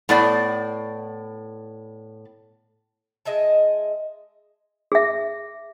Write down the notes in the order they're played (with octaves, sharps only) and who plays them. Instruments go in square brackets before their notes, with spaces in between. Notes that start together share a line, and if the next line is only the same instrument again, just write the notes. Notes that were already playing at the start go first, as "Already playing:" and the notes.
[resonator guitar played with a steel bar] A2 B3 D5
[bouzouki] G#3 D#5 E5 A5
[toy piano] G#4 E5